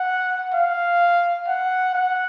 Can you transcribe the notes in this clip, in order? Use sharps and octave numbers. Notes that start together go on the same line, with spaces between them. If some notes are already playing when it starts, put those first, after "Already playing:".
Already playing: F#5
F5
F#5
F#5